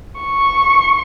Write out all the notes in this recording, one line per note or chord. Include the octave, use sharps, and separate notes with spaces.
C#6